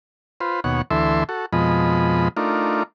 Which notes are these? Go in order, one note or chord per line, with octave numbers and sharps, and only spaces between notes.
F4 B4 C5
D#2 B2 C#5 F#5
D2 E3 A4 E5 C6
F#4 A4
F2 B2 F3 G#3 D#5 B5
A3 D4 D#4 F4 A#4